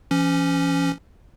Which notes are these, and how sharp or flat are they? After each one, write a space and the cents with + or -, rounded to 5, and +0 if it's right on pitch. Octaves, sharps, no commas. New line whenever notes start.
E3 +45 C#4 +0